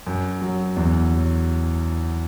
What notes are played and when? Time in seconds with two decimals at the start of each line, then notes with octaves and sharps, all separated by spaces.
0.07 F#2
0.41 F#3
0.77 E2
1.12 F#3